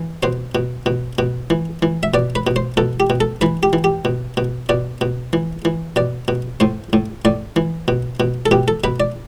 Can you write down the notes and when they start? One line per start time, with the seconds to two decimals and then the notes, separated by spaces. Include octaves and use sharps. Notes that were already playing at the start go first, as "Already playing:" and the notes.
Already playing: E3
0.23 B2 C5
0.55 B2
0.86 B2
1.19 B2
1.50 E3
1.82 E3
2.03 E5
2.14 B2 D5
2.35 B4
2.47 B2
2.56 C5
2.77 B2 A4
3.00 G4
3.10 B2
3.20 A4
3.41 E3 B4
3.63 G4
3.73 E3
3.84 G4
4.05 B2
4.37 B2
4.69 B2 D5
5.01 B2
5.33 E3
5.65 E3
5.96 B2 D5
6.28 B2
6.60 A2 C5
6.93 A2
7.25 A2 D5
7.56 E3
7.88 B2
8.20 B2
8.46 A4
8.51 B2 G4
8.68 A4
8.84 B2 B4
9.00 D5